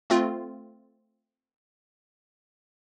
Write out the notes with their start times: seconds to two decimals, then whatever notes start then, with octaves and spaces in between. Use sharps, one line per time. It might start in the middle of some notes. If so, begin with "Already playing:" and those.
0.10 A3 C4 F4